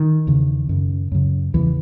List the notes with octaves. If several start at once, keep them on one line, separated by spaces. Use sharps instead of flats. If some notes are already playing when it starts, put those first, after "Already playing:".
Already playing: D#3
E2 C#3
F#2 C#3
F#2 C#3
E2 C#3 E3